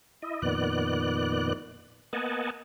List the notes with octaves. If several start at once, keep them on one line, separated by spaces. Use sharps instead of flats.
E4 D#5
F2 A#2 D#3 B3 D5 F#6
A#3 B3 D#5 F#5 G#5 A5